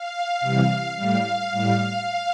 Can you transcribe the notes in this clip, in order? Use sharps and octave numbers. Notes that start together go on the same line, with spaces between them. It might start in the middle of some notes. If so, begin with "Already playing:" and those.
Already playing: F5
C3 E3 G3
A2 G3 F5
A2 G3